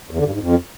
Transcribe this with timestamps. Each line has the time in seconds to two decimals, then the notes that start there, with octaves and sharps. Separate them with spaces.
0.11 E2
0.18 D3
0.26 G2
0.33 G#2
0.41 F2